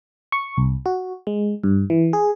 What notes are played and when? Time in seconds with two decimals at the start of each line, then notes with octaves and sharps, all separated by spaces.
0.32 C#6
0.58 C2
0.86 F#4
1.27 G#3
1.64 G2
1.90 E3
2.13 G#4